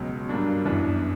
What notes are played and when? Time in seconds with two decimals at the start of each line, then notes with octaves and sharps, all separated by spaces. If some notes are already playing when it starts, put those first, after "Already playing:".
Already playing: C#2 B2 F#3
0.29 G2 F#3 A#3 D4
0.65 F#2 E3 B3 D4